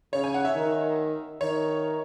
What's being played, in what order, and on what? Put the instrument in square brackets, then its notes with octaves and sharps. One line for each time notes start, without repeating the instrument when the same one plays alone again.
[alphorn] C#3 [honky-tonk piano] C#5
[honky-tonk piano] G#5
F#5
E5
[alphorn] D#3
[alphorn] D#3 [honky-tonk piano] C#5